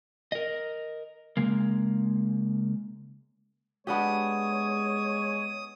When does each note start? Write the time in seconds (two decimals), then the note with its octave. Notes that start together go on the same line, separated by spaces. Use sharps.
0.32 A#4 D#5
1.37 C#3 G#3 A#3
3.87 G#3 B3 D4 G4 C#5 D#6